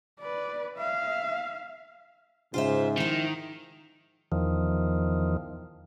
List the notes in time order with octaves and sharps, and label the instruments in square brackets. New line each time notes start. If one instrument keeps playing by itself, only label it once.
[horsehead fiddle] B4 D5
E5 F5
[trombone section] G#2 C#3 [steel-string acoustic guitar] F4 C5 E5
[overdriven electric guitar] D#3 [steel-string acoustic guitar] F3 E4
[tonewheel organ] E2 D#3 F3